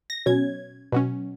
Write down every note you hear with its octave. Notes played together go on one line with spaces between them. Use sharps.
A#6
B2 F#3 C#4 G#6
B2 F#3 C#4